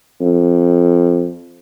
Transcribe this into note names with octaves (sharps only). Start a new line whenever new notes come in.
F2